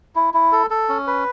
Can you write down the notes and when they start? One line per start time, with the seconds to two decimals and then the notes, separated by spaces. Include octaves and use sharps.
0.16 E4
0.34 E4
0.52 A4
0.70 A4
0.89 C#4
1.07 B4